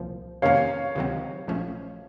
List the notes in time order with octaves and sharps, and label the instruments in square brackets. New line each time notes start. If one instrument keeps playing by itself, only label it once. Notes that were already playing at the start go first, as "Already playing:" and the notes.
Already playing: [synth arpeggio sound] C2 A#2 F3
[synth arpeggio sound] F2 C3 D#3 A#3 C#4 [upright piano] C#5 F5
[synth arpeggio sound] C#2 C3 D#3 F#3 C4
A#1 A#2 F3 A3 C#4